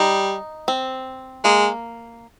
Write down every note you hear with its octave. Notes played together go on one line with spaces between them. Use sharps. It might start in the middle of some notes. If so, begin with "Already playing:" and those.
Already playing: G3 D#4
C4
G#3 A#3